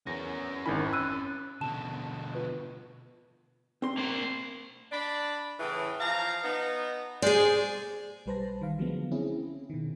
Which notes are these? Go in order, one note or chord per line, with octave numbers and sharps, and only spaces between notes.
E2 C#4 A#4 A#6
G#1 D#3 E4 G#5 B5
B5 E6 F#6 D#7
B2 D3 A5 E7
F4 B4
C4 C6
A#3 C5
D4 B5
A2 C#3 E3
F3 F5 A#5
B3 D#4
G#3 G#4 C5 D5
B1 G3 B4 C5 A5 A#6
D#3 F5
D3 F3 F#3 G#3 A3 B3
C4 C#4 E4 G#4
B2 D#3